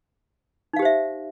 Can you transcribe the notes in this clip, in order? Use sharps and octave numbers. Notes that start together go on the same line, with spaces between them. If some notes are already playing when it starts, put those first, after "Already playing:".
D#4 G4 C5 E5 F5